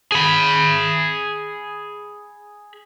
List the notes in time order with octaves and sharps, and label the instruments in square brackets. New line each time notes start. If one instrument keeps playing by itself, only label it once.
[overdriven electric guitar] G#4 B5